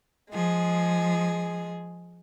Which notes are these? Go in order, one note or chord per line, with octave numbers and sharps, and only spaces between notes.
F3 G#3 G#4